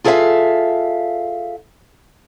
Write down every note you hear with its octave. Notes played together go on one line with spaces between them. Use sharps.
F4 G#4 A4 C#5 E5 F5